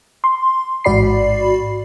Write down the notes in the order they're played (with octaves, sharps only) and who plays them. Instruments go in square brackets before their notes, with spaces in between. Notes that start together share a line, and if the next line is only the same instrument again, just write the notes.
[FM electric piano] C6
A1 G#2 F#4 D5 B5 C7